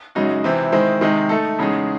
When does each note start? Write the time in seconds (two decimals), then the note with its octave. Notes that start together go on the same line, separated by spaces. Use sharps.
0.15 F#2 C#3 G#3 D#4 F#4
0.44 C3 E3 C4 E4
0.72 D#3 G#3 C4 E4 C5
1.01 C3 D#3 G#3 D#4
1.29 A3 D#4 A4
1.58 E2 C#3 G#3 D#4 G#4